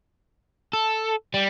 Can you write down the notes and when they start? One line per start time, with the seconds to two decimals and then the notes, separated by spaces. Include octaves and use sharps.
0.73 A4
1.34 G3